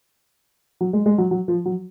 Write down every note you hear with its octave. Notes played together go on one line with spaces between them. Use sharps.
F#3
G#3
G#3
F#3
F#3
F3
F#3